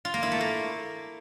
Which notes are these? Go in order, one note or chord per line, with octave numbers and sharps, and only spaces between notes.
F4
A#3
E4
A3
A#3